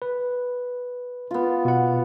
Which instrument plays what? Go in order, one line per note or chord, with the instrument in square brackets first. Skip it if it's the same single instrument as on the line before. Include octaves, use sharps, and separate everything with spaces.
[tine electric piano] B4
[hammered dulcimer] B3 F4
[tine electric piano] B2 F#5